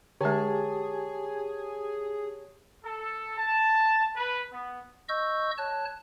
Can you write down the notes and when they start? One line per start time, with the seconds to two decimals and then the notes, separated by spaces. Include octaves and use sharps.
0.21 D3 G#3 G4 G#4 C#5 A5
2.84 A4
3.37 A5
4.16 B4
4.53 B3
5.09 D#5 C#6 E6 G6
5.58 C#5 A5 F#6